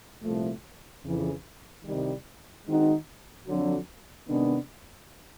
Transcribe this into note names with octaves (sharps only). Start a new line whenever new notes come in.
C2 A#2 F3 A3
F2 C#3 E3
C2 C3 D#3 G3
D#3 G#3 C4 D#4 F#4
F2 D3 F#3
C3 D#3 G#3 B3 D4